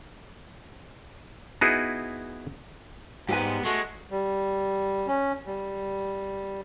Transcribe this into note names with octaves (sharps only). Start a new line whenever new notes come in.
B3 D#4 E4 F#4 G#4 B4
G#2 G3 B3 G4 B4 G#5
G#3 A3 F#4
G3
C#4
G3